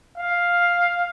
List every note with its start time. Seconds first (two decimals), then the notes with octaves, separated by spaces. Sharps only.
0.18 F5